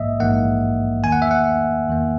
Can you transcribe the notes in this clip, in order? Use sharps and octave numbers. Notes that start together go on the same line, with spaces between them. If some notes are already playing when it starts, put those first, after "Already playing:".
Already playing: A#1 G#2 E3 A#3 D#5 E5
A#1 G#2 E3 A#3 F#5
E2 D#3 A#3 G#5
F#5
E5
F#5
E2 D#3 A#3